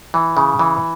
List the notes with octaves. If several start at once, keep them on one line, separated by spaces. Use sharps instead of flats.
E3
C#3
E3